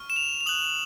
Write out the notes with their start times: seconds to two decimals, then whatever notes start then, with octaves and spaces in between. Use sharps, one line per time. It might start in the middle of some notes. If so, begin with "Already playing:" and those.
Already playing: C#6 F6
0.10 E7
0.16 F7
0.41 F7
0.46 D#6 F#6 F#7